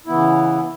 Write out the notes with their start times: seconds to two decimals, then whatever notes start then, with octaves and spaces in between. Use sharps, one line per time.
0.06 C#3 E3 B3 E4